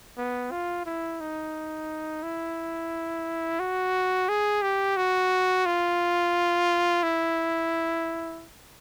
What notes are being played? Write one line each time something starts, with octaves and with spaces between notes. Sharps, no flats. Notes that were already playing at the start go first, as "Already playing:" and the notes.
B3
F4
E4
D#4
E4
F#4
G#4
G4
F#4
F4
E4